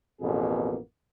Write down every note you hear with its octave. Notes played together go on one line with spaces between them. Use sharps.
A1 F2 B2 A#3 B3 G#4